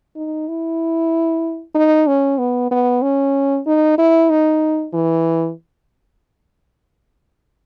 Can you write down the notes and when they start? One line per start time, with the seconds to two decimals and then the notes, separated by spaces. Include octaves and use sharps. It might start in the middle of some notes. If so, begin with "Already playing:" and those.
0.16 D#4
0.48 E4
1.75 D#4
2.07 C#4
2.38 B3
2.71 B3
3.02 C#4
3.66 D#4
3.98 E4
4.30 D#4
4.94 E3